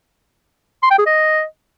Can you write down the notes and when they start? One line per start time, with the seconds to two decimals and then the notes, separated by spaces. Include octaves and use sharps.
0.83 C6
0.91 G5
0.98 G#4
1.06 D#5